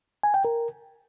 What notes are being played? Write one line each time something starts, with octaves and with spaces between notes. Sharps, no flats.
G#5
G5
A#4